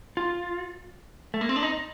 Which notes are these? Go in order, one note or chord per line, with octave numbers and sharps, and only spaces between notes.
F4
A3
A#3
C4
D4
D#4